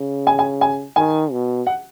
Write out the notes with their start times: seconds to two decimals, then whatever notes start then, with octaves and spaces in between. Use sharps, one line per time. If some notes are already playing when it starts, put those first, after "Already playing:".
Already playing: C#3
0.27 G#5
0.39 G#5
0.61 G#5
0.96 D#3 G#5
1.32 B2
1.67 F#5